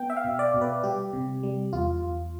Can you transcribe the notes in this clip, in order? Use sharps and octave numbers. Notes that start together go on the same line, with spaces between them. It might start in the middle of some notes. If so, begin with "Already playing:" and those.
Already playing: B3 G5
E5
F5
B2
D5
B2
B4
G3 G4
C3
G3
E2 F4
E2